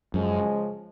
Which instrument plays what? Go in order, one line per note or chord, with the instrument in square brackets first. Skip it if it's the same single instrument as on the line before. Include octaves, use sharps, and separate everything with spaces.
[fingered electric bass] F#2 [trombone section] C#3 F3 G#3 C#4